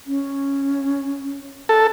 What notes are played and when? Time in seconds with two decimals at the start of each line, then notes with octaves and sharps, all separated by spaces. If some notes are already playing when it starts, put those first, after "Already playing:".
0.07 C#4
1.69 A4